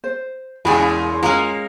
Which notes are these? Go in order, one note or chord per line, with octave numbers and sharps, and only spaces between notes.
C5
E2 A#2 C#3 G#3 G#4 G5 G#5 B5
G#3 A#3 C#4 F4 F5 A#5